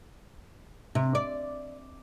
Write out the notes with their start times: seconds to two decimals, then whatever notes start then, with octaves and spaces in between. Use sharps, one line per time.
0.95 C3
1.15 D5